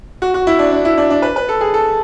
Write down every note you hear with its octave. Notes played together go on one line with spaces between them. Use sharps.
F#4
F#4
E4
D4
D4
E4
D4
D4
B4
B4
A4
G#4
A4